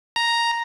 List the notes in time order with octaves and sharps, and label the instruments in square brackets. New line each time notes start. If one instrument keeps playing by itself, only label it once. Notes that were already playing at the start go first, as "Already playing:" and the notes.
[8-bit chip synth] A#5